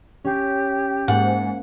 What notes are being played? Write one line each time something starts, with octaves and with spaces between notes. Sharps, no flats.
C#4 G4 C7
G#2 A#3 F#5